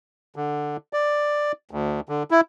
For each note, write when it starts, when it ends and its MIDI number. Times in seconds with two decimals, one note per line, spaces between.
0.36 0.77 50
0.93 1.52 74
1.71 2.00 38
2.09 2.23 50
2.31 2.41 64